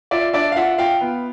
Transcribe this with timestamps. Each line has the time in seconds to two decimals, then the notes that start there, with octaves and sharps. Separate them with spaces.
0.11 F4 D5 E5
0.33 D4 D5 E5
0.52 F5
0.56 F4 E5 F#5
0.78 F4 F5 G5
1.01 B3